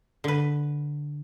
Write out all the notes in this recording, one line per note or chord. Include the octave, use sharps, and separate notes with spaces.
D3 B4